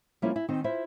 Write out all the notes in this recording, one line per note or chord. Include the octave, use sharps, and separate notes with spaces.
F3 G3 A#3 C#4 E4 F4
E4
D#3 C4 D#4
E4 F4 C5 E5